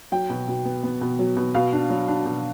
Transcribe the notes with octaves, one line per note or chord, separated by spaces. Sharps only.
F#3 G5
B2
B2
B3
B3
B2
F#3
B2
B2 F5
D4
F#3
D4
B2